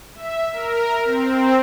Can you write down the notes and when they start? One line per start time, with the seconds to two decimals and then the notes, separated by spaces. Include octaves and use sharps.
0.15 E5
0.53 A#4
1.05 C4